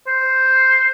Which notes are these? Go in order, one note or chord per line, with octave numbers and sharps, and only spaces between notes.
C5